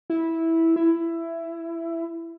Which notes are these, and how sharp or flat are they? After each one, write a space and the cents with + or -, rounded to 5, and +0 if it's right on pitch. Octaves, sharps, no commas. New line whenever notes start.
E4 -10
E4 +15